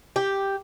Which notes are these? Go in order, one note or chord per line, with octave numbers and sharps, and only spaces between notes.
G4